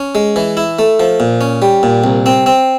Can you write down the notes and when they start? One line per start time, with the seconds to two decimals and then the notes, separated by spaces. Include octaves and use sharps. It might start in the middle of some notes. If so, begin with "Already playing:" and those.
Already playing: C#4
0.15 G#3
0.36 E3
0.57 E4
0.79 A3
1.00 F3
1.20 A#2
1.41 C#4
1.62 G3
1.83 A#2
2.04 C2
2.26 C4
2.46 C4